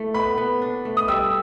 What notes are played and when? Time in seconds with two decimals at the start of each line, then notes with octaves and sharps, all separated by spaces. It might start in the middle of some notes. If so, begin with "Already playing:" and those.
Already playing: A3 E4
0.14 B3 B5
0.38 B3
0.62 D4
0.85 A3
0.97 D#6
1.08 G3 E6